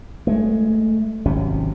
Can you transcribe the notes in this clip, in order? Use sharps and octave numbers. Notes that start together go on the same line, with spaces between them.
G#3 A3
G#1 C3 F#3 C#4